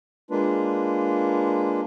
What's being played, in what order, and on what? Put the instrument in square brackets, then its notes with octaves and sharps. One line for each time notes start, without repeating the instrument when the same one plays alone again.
[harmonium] G#3 A#3 D4 F4 B4